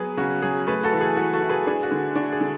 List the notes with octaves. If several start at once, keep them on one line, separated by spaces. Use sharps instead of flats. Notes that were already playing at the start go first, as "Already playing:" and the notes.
Already playing: F#3 B3 G#4 B4
C#3 F#4
F#3 G#4
A3 G#4 B4
F#4 A4
E3
G#4
E3 F#4
F#4 A4
E4
G#4 B4
D4 G#4
F#4
D3
D4 F#4
G#4
D3